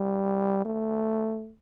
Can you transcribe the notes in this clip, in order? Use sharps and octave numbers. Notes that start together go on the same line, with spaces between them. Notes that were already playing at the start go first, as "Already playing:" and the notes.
Already playing: G3
A3